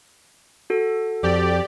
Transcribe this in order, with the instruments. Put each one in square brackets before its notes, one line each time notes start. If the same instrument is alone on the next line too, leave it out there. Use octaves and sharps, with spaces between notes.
[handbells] F#4 A4
[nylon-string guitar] F2 [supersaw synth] G4 D5